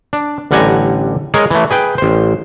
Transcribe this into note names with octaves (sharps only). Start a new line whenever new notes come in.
D4
A1 D3 G3 F#5 G#5 A#5
G#3 G#4 A#4 C#5 D#5
E3 A3
G#4 B4 G5
A1 C5